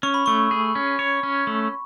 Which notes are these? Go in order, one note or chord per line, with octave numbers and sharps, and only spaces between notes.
C#4 C#6
B5
A3 C#6
G#4
C#4
C#5
C#4
A3